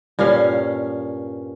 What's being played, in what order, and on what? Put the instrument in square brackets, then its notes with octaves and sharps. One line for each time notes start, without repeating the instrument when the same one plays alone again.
[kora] G2 A#2 C#4 F5